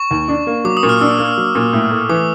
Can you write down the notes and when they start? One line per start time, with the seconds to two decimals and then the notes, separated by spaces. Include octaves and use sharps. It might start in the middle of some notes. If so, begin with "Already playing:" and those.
Already playing: C#6
0.11 D#2
0.28 D4
0.47 A#3
0.65 F#3 D6
0.77 D#6
0.83 A#2
0.89 F6
1.01 D4 E6
1.19 A#3
1.37 F#3
1.55 A#2
1.73 A2
1.91 A3
2.09 E3 D6